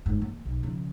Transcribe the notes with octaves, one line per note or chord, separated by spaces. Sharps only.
G1 G#2
E3 A#3
B1
C#3 F3